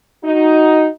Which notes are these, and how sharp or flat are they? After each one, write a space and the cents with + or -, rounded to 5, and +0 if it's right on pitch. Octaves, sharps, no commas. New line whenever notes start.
D#4 +5 F#4 +0